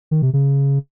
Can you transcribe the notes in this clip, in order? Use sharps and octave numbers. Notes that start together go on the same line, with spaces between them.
D#3
C3
C#3